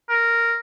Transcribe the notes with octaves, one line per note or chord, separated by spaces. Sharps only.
A#4